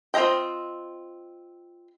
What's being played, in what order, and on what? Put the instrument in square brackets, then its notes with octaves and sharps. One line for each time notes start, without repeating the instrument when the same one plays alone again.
[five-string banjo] C4 F4 A4 D#5 G5